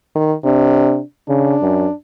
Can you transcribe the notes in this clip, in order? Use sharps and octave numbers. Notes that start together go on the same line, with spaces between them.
D#3
C3 D4
C#3 D4
F#2